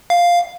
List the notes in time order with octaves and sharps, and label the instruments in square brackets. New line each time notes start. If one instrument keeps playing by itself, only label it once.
[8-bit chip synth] F5